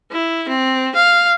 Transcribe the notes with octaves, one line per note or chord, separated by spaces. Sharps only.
E4
C4
F5